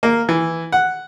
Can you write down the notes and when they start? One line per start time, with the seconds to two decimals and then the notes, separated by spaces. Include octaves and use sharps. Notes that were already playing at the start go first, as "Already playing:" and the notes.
0.03 A#3
0.29 E3
0.72 F#5